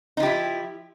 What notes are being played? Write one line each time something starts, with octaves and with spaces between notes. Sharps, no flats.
F3 D#4 E4 G4